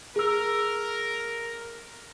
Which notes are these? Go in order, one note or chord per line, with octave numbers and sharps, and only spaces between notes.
G#4 A#4 E6